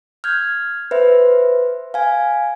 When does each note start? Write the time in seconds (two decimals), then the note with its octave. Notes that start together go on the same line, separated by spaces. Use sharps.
0.24 F6 G6 G#6
0.91 B4 C5 E5
1.94 F5 G#5